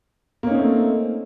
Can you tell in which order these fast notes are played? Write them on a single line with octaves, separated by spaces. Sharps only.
A#3 C#4 D#4 C4 A3